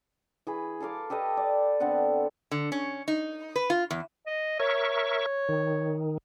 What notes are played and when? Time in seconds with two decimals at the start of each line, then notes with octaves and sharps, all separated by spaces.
0.47 E3 G#4 B5
0.80 A4 A#4 F5 D6
1.10 G4 A4 B4 D#5
1.37 D5
1.80 D3 B3 C4 F#5
2.51 D3
2.72 C#4
3.08 D#4
3.56 B4
3.70 F4
3.91 E2
4.27 D#5
4.60 A#4 C#5 E5 C#6
5.49 D#3